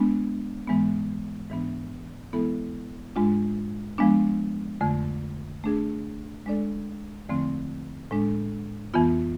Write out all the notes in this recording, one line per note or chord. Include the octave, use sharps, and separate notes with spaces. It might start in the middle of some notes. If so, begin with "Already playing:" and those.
Already playing: G#3 B3 D4
G#2 E3 G#3 B3
G#2 E3 B3 D4
E3 G#3 B3 E4 A4
G#2 G#3 D4 F4
F3 G#3 B3 D4
F2 D3 A3
A3 D4 G#4
G#3 D4 A4 D5
E2 D3 F3 A3 C4
A2 G#3 D4
F2 E3 B3 F4